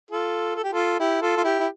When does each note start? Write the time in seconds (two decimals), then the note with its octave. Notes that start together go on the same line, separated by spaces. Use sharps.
0.11 F4 A4
0.56 A4
0.64 G4
0.72 F4 A4
1.00 E4 G4
1.22 F4 A4
1.37 F4
1.44 E4 G4
1.60 E4